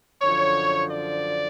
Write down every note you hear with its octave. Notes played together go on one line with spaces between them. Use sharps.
F#2 D3 F3 C#5
D5